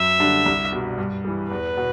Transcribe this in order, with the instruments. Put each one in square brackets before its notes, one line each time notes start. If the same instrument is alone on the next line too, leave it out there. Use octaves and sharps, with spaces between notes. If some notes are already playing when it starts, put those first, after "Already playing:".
Already playing: [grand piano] F#2 [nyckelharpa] E5
[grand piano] D3 G3 D4
C2
B2 G3
G2
E3 G3
[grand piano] E2 [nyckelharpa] B4
[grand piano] B2